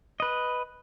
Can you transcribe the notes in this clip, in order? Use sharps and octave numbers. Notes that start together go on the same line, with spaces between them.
B4 D#5